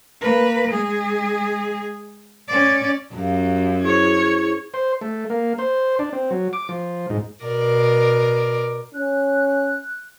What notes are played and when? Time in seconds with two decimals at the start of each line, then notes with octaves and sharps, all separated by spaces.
0.21 A#3 B4
0.72 G#3 G#4
2.48 C#4 D5
3.14 F#2 F#4 G4 F5
3.82 E4 G#4 C5 C#5 G#6
4.74 C5
5.01 A3
5.30 A#3
5.59 C5
5.99 D4
6.13 C4
6.31 F#3
6.53 D6
6.69 F3
7.10 G#2
7.44 B2 A#4 D5
8.95 C#4 F#6